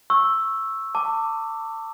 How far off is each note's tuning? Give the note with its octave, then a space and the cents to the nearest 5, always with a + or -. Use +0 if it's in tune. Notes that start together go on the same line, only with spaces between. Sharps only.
C#6 -15 E6 +0
A5 +30 D6 +0